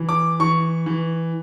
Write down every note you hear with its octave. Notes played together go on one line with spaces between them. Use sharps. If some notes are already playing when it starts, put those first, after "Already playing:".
Already playing: E3
D6
E3 C#6
E3